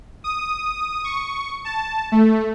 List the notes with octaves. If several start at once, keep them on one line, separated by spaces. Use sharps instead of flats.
D#6
C#6
A5
A3